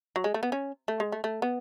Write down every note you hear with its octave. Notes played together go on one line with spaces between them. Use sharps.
F#3
G#3
A3
B3
C#4
A3
G#3
A3
A3
B3